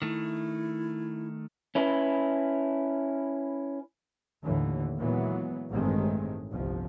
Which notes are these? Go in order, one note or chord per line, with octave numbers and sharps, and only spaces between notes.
D#3 A3 E4
C#4 E4 B4
D#2 A2 D3 E3
A#2 E3 F#3 G#3 B3
A1 G2 D#3 G#3 A3 C4
G1 C2 F3